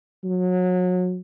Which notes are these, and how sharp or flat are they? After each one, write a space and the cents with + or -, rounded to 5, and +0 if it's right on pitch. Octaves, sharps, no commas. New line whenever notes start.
F#3 -30